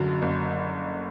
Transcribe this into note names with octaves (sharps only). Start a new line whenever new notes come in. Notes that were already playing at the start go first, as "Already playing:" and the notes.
Already playing: F#1 F#2 D3 F#3
F#1